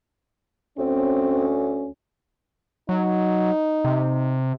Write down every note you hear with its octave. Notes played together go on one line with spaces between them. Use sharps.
D2 C4 C#4
F#3 D#4
C3